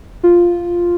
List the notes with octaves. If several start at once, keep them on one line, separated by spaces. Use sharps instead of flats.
F4